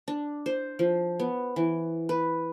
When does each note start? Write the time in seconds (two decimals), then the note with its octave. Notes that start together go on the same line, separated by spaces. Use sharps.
0.08 D4
0.46 C5
0.79 F3
1.20 B3
1.56 E3
2.09 B4